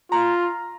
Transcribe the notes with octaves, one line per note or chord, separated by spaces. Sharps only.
F4 A#5